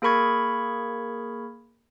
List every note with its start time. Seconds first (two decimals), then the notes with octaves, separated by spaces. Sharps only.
0.02 A#3 G#4 A#4 B5 C#6 G#6